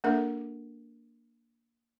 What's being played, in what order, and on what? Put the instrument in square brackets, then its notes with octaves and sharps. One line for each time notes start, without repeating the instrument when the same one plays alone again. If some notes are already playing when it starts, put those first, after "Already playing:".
[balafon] A#3 D4 A4 A#4 E5